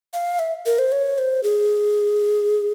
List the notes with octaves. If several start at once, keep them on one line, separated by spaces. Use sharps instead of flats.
F5
E5
A#4
C5
C#5
C5
G#4